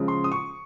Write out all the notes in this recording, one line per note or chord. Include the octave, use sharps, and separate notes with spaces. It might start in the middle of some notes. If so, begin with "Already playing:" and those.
Already playing: C#3 F3 G#3
C6
D#6
C#6